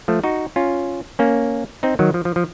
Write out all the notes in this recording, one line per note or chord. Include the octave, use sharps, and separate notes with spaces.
F3 A3
D#4 F#4
C#4 F4
A#3 C#4
C4 D#4
D#3 F#3
F3
F3
F3